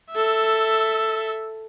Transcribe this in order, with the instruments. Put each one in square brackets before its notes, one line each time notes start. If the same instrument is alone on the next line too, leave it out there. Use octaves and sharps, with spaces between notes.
[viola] A4 E5